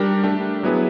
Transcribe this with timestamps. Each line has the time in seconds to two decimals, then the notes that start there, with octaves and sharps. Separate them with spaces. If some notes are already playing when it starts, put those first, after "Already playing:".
Already playing: G3 D4 G4 A#4
0.24 A3 D4 G4
0.63 F#3 B3 E4 G#4 B4